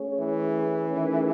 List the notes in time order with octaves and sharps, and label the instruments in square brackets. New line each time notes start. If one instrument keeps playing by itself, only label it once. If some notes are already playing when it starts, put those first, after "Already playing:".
Already playing: [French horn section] A3 C#4 G#4 C#5
[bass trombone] E3
[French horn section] D#3 A3 C#4 G#4